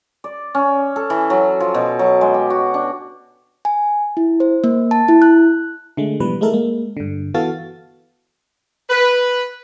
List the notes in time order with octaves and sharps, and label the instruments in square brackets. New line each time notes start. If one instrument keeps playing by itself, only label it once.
[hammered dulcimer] D5
C#4
A4
E3
F#3
F3
B2
F#3
G#3
G4
F#4
D4
[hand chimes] G#5
E4
C5
A#3
A5
E4
F#6
[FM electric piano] D3 G#3 A3
B2 E3 F3 G3 B4
G#3 A3 E4 A4 A#4
G#3 A#3
G2 D3
E3 B3 F#4 A4 F5 A6
[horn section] B4